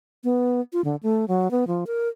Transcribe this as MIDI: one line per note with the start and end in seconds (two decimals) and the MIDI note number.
0.24 0.61 59
0.73 0.81 65
0.85 0.96 50
1.03 1.25 57
1.28 1.51 54
1.51 1.65 59
1.67 1.84 53
1.87 2.08 70